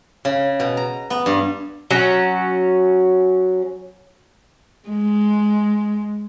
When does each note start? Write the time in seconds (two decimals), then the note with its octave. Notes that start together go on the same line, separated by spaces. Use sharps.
0.25 C#3
0.60 B2
0.77 A#5
1.10 B3
1.26 G2
1.91 F#3 C#4
4.89 G#3